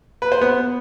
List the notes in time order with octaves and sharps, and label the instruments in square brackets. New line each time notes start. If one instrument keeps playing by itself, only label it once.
[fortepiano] B4
C5
B3